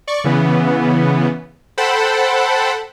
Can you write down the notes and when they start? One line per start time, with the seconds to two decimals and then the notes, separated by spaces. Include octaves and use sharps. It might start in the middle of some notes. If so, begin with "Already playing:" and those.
0.07 D5 C#6
0.24 C#3 E3 B3
1.78 A4 C5 F#5 G5 A5 B5